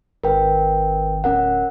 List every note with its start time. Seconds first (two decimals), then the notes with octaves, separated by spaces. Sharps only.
0.24 G#1 A#4 B4 G5
1.24 D1 C#4 A#4 F#5